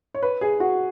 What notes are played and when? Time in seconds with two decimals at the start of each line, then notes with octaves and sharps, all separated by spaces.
0.14 C#5
0.23 B4
0.41 G#4
0.60 F#4